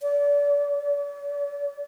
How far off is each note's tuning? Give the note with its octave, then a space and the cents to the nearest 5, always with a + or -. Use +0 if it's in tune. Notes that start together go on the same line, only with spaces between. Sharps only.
D5 -35
D5 -45